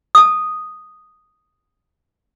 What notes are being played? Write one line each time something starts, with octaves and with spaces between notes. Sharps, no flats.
A5 D#6